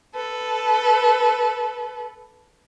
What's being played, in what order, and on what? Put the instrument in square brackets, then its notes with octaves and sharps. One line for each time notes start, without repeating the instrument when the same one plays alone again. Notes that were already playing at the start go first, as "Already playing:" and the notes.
[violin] A4 B4